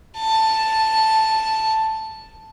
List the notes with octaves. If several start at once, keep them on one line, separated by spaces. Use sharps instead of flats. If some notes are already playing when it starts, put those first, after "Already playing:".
A5